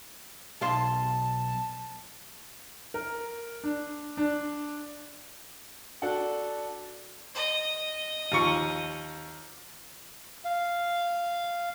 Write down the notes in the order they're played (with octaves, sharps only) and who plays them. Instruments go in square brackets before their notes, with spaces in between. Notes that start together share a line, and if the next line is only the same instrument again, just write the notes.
[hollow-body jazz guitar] B1 F5 C6 [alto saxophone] A5
[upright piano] A#4
D4
D4
D4 F#4 A4 F#5
[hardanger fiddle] D#5
[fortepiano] D#2 F3 C#6
[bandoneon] F5